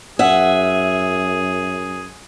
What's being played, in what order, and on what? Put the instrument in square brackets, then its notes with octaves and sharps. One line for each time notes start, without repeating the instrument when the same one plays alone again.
[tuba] F#2 [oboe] G#4 [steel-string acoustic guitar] E5 F#5